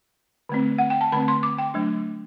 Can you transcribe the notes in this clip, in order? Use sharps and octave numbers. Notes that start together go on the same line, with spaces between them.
D3 A3 C4
F#5
G5
A5
D3 A3 C4 B5
C6
D6
G5
F#3 A3 D4